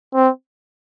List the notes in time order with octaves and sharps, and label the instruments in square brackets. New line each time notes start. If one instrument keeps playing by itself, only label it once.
[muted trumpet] C4